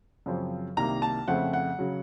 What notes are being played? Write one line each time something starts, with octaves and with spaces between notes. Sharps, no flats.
F#2 C#3 F3 C4
C2 C3 D#3 A#3 A#5
A5
F2 C#3 A3 C4 F#5
F#5
C#3 F#3